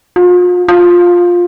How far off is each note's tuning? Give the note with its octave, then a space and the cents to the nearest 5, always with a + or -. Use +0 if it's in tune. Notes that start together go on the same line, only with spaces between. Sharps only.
F4 +40
F4 +10